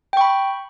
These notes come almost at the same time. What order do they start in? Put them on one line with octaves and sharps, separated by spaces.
G5 C#6 B5